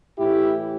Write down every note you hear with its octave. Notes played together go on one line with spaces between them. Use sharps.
A2 E3 E4 G4